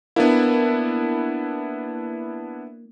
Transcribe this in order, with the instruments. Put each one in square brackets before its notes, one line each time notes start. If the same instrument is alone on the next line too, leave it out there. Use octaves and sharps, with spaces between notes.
[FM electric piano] A#3 [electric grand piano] B3 D4 E4